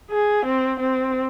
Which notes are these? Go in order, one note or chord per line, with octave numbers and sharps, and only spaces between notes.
G#4
C4
C4